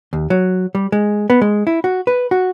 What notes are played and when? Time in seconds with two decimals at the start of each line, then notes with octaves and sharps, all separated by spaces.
0.13 D#2
0.30 F#3
0.75 G3
0.92 G#3
1.30 B3
1.41 G#3
1.67 E4
1.84 F#4
2.07 B4
2.31 F#4